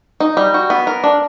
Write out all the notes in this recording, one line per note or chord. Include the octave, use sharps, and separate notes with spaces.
D#4
G3
F#4
B3
A#4
D4